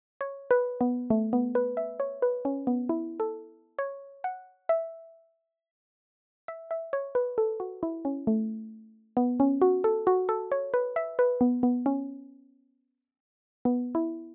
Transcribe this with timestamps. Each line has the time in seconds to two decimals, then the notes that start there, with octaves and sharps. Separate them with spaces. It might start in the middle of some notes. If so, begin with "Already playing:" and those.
0.21 C#5
0.51 B4
0.81 B3
1.10 A3
1.33 B3
1.55 B4
1.77 E5
2.00 C#5
2.22 B4
2.45 C#4
2.67 B3
2.89 E4
3.20 A4
3.79 C#5
4.24 F#5
4.69 E5
6.48 E5
6.71 E5
6.93 C#5
7.15 B4
7.38 A4
7.60 F#4
7.83 E4
8.05 C#4
8.27 A3
9.17 B3
9.40 C#4
9.62 F#4
9.84 A4
10.07 F#4
10.29 A4
10.52 C#5
10.74 B4
10.96 E5
11.19 B4
11.41 B3
11.63 B3
11.86 C#4
13.65 B3
13.95 E4